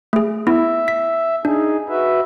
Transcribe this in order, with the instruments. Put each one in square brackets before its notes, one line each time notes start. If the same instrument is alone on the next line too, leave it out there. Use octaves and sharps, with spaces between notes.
[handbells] A3 G#4
[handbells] B3 E4 [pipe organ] E5
[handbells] B6
[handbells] D4 [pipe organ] D#4 G#4
[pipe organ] F#4 B4 E5